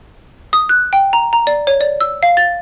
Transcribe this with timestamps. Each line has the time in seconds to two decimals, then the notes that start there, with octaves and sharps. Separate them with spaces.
0.53 D#6
0.69 F#6
0.93 G5
1.13 A#5
1.33 A#5
1.47 D5
1.67 C#5
1.81 D5
2.01 E6
2.23 F5
2.37 A6